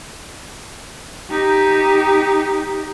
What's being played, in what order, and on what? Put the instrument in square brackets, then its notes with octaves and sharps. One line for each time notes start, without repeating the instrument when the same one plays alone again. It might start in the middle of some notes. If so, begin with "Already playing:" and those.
[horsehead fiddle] D#4 G4